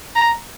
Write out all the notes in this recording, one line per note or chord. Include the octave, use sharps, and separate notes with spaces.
A#5